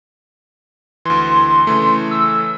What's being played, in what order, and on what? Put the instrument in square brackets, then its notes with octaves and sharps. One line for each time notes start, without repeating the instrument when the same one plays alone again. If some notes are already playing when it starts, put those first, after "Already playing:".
[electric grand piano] D2 E3 [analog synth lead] C6
[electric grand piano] C#3 E3 A3
[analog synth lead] E6